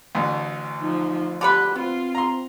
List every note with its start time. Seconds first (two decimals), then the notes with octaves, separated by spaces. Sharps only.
0.15 A1 D2
0.80 F3 D#4
1.41 D3 B3 G4 B4 F#6
1.76 B3 C4 F4
2.15 A#5 C6